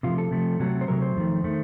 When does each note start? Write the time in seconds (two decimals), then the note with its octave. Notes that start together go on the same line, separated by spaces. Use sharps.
0.03 C3 F3 A3 F4
0.18 A4
0.31 C3 F3 A3
0.59 C3 F#3 A3
0.81 C5
0.88 C3 F#3 A3 A#4
1.02 C5
1.16 F2 D#3 A3
1.44 D#3 A3